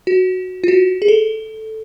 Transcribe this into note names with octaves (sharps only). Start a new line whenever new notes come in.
F#4
F4
F#4
G#4
A4